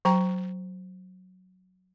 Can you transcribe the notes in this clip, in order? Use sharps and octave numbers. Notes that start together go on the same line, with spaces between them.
F#3 G5 A#5